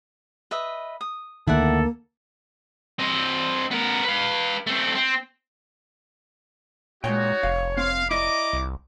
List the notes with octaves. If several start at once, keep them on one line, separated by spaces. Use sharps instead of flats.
B4 D#5 E5
D#6
D2 D#3 A#3 E4 A4 D5 F#5
C4 D#5
B3 A#4
B4 F5
A3 C4
C4
A#2 G#3 D#4 F#4 C#5 G5
F1 F5
C4 F5
E4 D5 D#5 A#5 D6
C2